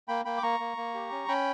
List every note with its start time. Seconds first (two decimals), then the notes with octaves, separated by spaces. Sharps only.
0.08 A#3 G5 B5
0.25 A#3 G5 B5
0.38 D6
0.42 A#3 A#5 C#6
0.60 A#3
0.77 A#3
0.94 G4
1.11 C#4
1.28 C#4 G5 B5